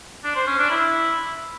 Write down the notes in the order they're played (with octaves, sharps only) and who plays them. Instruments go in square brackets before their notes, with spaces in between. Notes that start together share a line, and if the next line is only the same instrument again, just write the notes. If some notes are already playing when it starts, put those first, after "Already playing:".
[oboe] D4
C5
C#4
D4
E4